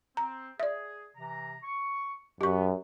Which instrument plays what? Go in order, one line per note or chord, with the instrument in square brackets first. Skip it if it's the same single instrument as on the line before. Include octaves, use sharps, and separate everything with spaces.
[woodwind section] C4 [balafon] A#5
[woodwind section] G#4 [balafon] D5 E5
[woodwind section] C3 E3 A#5
C#6
[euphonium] F#2 [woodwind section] F#3 B3 [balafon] G4 C#6